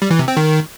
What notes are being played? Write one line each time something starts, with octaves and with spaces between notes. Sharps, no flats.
G3
E3
C3
C4
D#3